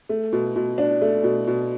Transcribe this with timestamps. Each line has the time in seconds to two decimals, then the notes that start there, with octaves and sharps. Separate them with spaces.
0.09 A3
0.33 B2
0.56 B2
0.78 D4
1.01 A3
1.24 B2
1.47 B2